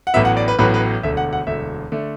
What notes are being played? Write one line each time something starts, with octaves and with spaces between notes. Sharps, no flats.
F#5
A1 A2 F#3 B3 E5
F#5
D5
B4
A1 A2 F#3 B3 B4
B4
E1 D2 D3 E5
F#5
F#5
E1 D2 D3 E5
D3 A3